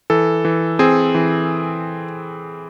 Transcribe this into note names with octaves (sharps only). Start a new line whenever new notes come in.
E3 A4
E3
C4 G#4
E3